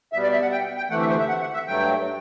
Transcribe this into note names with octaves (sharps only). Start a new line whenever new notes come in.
B2 G3 E5
D5
E5
F#5
G5
G5
D2 C3 E3 A3 F#5
E5
C5
E5
F#5
F#5
E5
G2 F#3 A3 G5